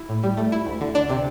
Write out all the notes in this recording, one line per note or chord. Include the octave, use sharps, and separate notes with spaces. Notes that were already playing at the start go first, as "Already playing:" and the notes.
Already playing: E4
A2
G3
A3
E4
D2
D3
D4
C3